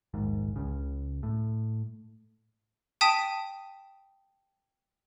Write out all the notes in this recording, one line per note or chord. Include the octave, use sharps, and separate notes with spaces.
E1 A#1 D#2 G#2
C#2 C#3
A2
G5 A5 D#6 B6 D#7